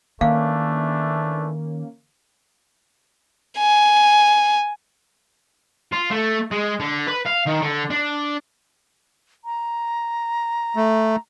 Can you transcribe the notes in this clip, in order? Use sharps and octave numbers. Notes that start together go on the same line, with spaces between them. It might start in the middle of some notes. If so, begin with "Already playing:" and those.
D#3 E3 A3 A#3 C#4 D4 F5
G#5
F4
A3
G#3
D3
B4
F5
D#3
D3
D4
A#5
A3